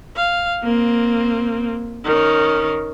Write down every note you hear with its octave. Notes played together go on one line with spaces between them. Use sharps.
F5
A#3 C4
D#3 C#4